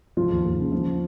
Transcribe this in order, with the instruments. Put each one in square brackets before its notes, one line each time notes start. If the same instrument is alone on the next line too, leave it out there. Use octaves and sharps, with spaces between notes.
[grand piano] F3 F4
D#2
D#2
C#3
F3